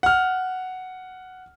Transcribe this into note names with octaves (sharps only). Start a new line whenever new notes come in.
F#5 F6